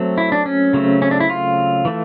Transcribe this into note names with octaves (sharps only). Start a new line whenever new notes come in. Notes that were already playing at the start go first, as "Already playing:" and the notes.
Already playing: F#3 A3 C4
E4
D4
C#4
C#3 F#3 A3 C4
C#4
D4
E4
F4
E3 A3